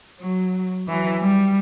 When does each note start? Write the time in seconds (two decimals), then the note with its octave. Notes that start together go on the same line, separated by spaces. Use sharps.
0.20 F#3
0.88 E3 F#3
1.20 G3